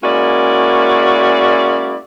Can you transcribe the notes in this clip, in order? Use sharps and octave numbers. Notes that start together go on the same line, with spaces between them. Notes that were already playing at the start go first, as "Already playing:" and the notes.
G#3 A#3 C#4 E4 F#4 D5